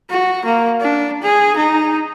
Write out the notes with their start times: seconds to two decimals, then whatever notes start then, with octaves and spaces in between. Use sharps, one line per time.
0.10 F#4
0.45 A#3
0.80 D4
1.22 G#4
1.56 D#4